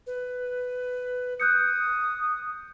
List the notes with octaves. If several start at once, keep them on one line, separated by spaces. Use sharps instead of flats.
B4
D#6 F#6 G6 C#7